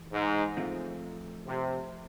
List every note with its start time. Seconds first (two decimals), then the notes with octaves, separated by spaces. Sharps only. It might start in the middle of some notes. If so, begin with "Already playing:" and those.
Already playing: E3
0.12 G#2
0.57 F3 A3 C4 F4
1.47 C3